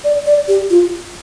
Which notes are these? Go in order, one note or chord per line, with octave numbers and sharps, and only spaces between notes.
D5
D5
G4
F4